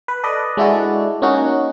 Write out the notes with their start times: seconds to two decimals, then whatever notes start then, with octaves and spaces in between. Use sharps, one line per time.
0.08 B4
0.23 A4 B4 D5 D#5
0.57 G#3 D4 E4 F#4 A4 D5
1.22 A#3 C#4 D#4 F#4